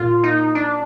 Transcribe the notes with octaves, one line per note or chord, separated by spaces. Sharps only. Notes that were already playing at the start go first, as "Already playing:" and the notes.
Already playing: A#2 F4
D#4
D4